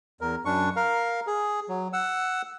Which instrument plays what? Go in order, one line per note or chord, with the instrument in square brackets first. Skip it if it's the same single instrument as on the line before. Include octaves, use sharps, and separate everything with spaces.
[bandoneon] E2 A#4
F#2 D4 C#6
A#4 F5
G#4
F#3
F#5 E6